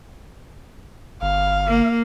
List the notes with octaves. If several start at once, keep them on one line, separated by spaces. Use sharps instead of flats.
G1 F5
A#3